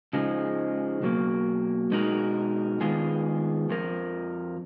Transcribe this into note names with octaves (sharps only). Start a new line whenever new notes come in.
C#3 F3 G#3 D#4
B2 F#3 A#3
B2 G#3 D#4 F#4 A#4
D#3 G#3 B3 F4 G#4
F2 F3 A#4